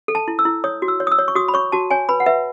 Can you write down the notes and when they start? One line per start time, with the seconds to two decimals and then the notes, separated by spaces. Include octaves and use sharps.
0.08 A4
0.15 A5
0.28 E4
0.39 E6
0.45 E4
0.64 C#5 D#6
0.82 F#4
0.88 E6
1.00 C#5
1.07 D#6
1.12 E6
1.18 C#5
1.28 C#6
1.35 F#4 D#6
1.48 B5
1.54 C#5 C#6
1.72 F#4 A5
1.91 C#5 G#5
2.09 B4 B5
2.20 F#5
2.26 B4 E5